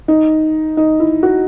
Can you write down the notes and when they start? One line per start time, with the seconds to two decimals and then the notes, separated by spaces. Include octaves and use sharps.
0.08 D#4
0.77 D#4
1.00 E4
1.23 F#4